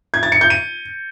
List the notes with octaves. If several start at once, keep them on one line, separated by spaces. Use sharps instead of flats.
G#6
A6
C#7
G6
D#7